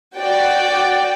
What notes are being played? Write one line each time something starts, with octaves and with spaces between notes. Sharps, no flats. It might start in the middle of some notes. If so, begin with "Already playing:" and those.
F#4 D5 G5